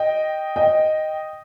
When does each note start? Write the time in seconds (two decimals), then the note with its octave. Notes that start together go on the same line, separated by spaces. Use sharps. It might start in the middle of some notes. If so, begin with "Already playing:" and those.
Already playing: D#5 G5
0.56 D#5 G5